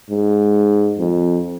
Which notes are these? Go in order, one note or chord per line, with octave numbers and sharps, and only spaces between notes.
G#2
F2